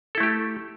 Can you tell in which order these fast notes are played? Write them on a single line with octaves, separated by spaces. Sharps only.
A4 E4 A3 G4